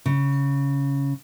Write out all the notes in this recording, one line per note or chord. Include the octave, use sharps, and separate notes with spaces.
C#3